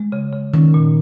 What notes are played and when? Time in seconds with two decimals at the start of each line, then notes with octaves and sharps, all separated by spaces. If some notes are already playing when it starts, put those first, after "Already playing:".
Already playing: G#3
0.12 C#3
0.33 C#3
0.54 D#3 C#4
0.74 A#2